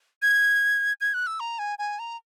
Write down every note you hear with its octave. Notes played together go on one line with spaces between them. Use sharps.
G#6
G#6
F#6
E6
A#5
G#5
G#5
A#5